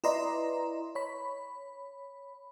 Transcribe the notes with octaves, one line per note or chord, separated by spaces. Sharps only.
E4 B4 D5 D#5 A#5 C6
C#5 B5